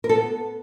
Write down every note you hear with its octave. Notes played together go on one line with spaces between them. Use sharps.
A#4
A4
B3